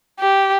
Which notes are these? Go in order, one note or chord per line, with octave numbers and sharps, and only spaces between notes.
G4